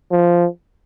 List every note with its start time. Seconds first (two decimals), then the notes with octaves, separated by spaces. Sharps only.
0.11 F3